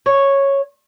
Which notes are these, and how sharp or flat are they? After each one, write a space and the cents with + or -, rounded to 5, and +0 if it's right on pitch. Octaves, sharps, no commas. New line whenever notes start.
C#5 -5